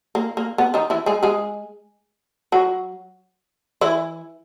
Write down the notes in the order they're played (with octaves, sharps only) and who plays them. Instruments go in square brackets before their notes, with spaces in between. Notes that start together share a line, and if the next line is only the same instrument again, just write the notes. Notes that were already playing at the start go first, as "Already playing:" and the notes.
[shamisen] A#3
A#3
B3
D#3 D#4
E3 E4
G#3 G#4
G#3 G#4
F#3 F#4
E3 E4